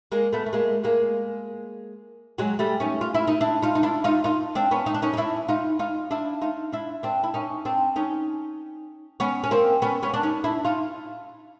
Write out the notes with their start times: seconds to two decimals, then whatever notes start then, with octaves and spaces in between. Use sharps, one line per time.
0.12 G#3 A#3
0.33 A3 B3
0.46 A3
0.53 G#3 A#3
0.84 G#3 A#3
2.38 F#3 G#3
2.59 G3 A3
2.80 C#4 D#4
3.01 F4
3.14 E4
3.27 D#4
3.41 D4 E4
3.62 D#4 F4
3.75 D#4
3.83 D4 E4
4.04 D#4 F4
4.24 D#4 F4
4.55 C4 D4
4.71 B3 C#4
4.86 D#4
4.94 D4
5.02 C#4 D#4
5.14 D#4
5.17 D4 E4
5.48 D#4 F4
5.79 D#4 F4
6.11 D4 E4
6.41 D#4 F4
6.72 D4 E4
7.03 C4 D4
7.24 E4
7.34 C#4 D#4
7.65 C4 D4
7.96 C#4 D#4
9.20 B3 C#4
9.44 C#4
9.51 A#3 C4
9.82 B3 C#4
10.02 B3 C#4
10.14 D4
10.23 C#4 D#4
10.44 D4 E4
10.65 D#4 F4